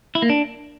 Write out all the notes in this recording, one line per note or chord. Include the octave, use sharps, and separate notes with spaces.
E4
A#3
D4